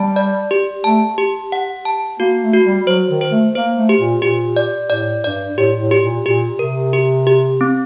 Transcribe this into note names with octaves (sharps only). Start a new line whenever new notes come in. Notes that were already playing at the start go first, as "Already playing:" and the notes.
Already playing: G3 A5
D5
G4
A3 A5
G4
F#5
A5
A#3 F#4
A3
F#4
G3
F#3 C5
D#3
C5
A3
A#3 C5
A3
G4
A#2
A#2 G4
D5
A2 D5
G2 D5
A2 G4
A2
G4
A#2
A#2 G4
C3 A#4
G4
G4
C4